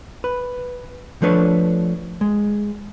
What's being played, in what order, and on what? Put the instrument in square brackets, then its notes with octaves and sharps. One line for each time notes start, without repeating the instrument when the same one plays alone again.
[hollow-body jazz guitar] B4
F3 A3 D4 B4 C#5
G#3